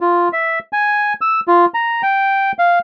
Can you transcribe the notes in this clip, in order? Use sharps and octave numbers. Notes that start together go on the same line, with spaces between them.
F4
E5
G#5
E6
F4
A#5
G5
F5